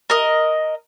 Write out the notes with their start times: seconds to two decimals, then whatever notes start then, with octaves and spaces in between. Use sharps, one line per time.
0.10 A#4 D#5